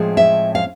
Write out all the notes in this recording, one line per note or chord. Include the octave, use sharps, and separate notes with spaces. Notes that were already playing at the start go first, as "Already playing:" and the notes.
Already playing: A2 F3 G#3 C4
E5
F5